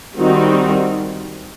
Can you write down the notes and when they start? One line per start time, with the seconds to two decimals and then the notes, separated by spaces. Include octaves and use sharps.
0.17 D#3 G3 C4 D#4 F#4